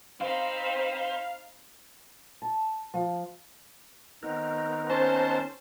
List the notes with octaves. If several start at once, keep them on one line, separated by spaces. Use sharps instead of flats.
C4 D#4 C5 F5 B5
A5
F3
D#3 B3 C4 D#4 A#4
C#4 C5 A5